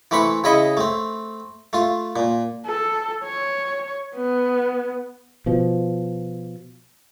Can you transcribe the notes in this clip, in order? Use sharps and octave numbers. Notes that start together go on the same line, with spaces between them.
E3 A3 C4 B5 C#6
C#3 E4 D#5 B5 C#6
A3 C4
A3 F4
A#2
A4
C#5
B3
B2 F3